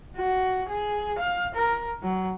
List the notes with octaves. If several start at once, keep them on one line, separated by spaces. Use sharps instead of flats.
F#4
G#4
F5
A#4
F#3